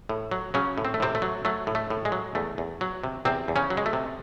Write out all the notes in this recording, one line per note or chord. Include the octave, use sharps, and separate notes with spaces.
A2
F#3
C#3 F#3 C#4
A2
C4
A3
A2 C3 C4
A3
F#3
F#3 A3
A2
A3
A2
G#3
F#3
E2 A3
E2
F#3
C3
E2 C3 C4
E2
C#3 C#4
F#3
G#3
A3
C3